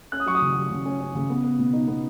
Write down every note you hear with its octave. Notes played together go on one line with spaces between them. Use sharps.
C#4 F#6
D#6
F#3 C#6
D#6
C#3
F#3
C#3
C#4
C#4
C#3
B3
B3
B2
D#4
B3